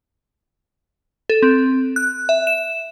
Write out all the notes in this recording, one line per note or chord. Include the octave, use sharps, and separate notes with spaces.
A4
C4
F#6
E5
E7